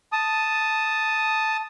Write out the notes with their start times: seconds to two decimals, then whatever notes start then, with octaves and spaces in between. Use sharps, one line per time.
0.12 A5 D#6